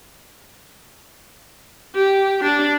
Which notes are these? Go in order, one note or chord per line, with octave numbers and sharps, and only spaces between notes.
G4
D4